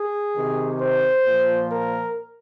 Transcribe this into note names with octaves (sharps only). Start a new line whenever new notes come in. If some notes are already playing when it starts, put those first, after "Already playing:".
Already playing: G#4
C3 D#3
C5
A#2 F3
A#4